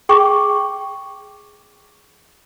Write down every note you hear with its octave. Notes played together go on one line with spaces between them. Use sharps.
G#4 G5 C#6 D6